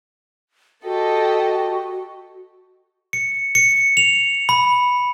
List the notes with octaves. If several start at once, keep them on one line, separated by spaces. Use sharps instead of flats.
F#4 G4 A4 D#5
C#7
C#7
F7
B5